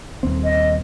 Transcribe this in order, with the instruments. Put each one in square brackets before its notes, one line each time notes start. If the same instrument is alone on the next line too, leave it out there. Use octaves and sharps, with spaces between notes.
[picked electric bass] D#1 C4
[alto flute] D#5